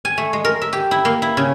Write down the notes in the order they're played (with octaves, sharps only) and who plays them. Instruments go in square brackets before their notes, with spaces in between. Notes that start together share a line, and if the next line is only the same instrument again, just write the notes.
[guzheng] G#5
A3
G#3
A#4
E5
G4
E4
A#3
E4
C#3